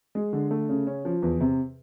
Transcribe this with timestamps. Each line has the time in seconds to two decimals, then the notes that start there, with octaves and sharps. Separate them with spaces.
0.15 G#3
0.33 D3
0.51 A3
0.69 C#3
0.87 C#4
1.05 F3
1.22 E2
1.41 C3